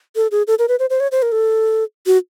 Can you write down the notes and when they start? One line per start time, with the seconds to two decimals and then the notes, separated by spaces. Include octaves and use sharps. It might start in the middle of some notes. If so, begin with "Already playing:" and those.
0.16 A4
0.31 G#4
0.47 A4
0.59 A#4
0.68 B4
0.79 C5
0.90 C5
1.00 C#5
1.12 C5
1.22 A#4
1.32 A4
2.06 F#4